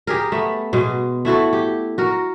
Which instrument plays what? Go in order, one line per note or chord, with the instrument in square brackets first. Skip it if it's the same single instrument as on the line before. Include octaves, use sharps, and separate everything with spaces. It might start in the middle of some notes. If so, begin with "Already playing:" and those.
[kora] G4 G#4 A#4
A3 B3
B2 G#3
A3 E4 F#4 A4
G4
F#4 A#4